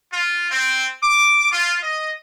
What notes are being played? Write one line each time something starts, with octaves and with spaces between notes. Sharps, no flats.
F4
C4
D6
F4
D#5